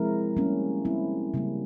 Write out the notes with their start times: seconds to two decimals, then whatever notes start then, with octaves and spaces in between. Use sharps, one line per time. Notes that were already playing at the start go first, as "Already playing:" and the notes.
Already playing: F3 G#3 C4 E4 A#4
0.37 G3 A#3 C#4
0.85 G3 C4 E4
1.34 C#3 G3 A#3